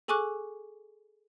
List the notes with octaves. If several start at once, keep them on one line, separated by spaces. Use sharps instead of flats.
G#4 A4 G#5 C#6 D6 F#6